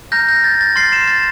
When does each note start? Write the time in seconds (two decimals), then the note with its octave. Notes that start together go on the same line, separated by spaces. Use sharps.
0.12 A#5 F6 G6 A#6
0.29 G6
0.44 A6
0.61 A6
0.76 C6 F6 A6 C7
0.92 C7 E7
1.07 A6